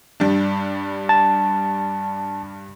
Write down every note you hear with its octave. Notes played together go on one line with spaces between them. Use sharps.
G2 G3 D4
A5